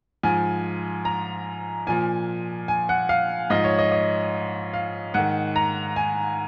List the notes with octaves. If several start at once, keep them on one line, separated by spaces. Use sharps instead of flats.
G#2 F3 G#5
A#5
A#2 F3 G#5
G#5
F#5
F5
G#2 F3 D#5
C#5
D#5
D#5
F5
G#2 D#3 F#5
A#5
G#5